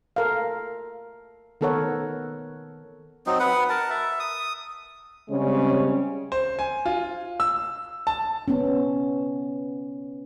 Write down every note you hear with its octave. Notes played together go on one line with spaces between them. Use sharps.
A4 A#4 F5
D#3 B3 A4 A#4 C#5 F#5
F#3 C4 D#4
B4 F#5
A#4 A5
E5
D#6
C#3 G3 G#3 C4 C#4
C5
G#5
F4
E6
A5
B3 C#4